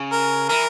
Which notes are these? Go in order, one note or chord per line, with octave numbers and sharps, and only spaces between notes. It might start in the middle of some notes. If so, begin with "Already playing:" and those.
Already playing: C#3
A#4
E3 A#4